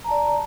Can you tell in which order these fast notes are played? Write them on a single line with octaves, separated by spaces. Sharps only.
A#5 A5 D5